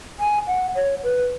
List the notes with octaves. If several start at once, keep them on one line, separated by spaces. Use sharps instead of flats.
G#5
F#5
C#5
B4